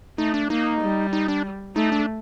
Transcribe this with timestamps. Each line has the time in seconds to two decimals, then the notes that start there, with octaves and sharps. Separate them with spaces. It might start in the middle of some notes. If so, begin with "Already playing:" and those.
0.18 A3 D#4
0.34 D4
0.50 A#3 D#4
0.82 G3
1.13 D#4
1.28 D4
1.76 A3 D#4
1.92 D4